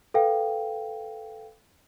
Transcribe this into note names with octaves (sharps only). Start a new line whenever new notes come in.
A4 B4 F5 G5